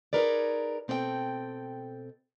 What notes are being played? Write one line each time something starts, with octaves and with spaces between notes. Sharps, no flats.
D#4 G#4 A#4 B4 D5
B2 C4 A4 C#5 G5